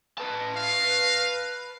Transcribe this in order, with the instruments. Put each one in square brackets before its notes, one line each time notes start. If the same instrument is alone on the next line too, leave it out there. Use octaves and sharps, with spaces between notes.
[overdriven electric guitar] B4 A5
[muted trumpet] F5